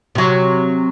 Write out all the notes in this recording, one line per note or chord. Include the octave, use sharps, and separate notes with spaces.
C3 F#3